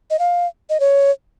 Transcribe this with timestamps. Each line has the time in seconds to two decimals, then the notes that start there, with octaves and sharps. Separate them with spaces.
0.10 D#5
0.19 F5
0.70 D#5
0.80 C#5